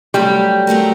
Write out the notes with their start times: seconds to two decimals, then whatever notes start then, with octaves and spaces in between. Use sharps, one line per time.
0.14 F#3 G3 A3 C4 G4 A#4
0.67 F#3 A3 C4 G4 A#4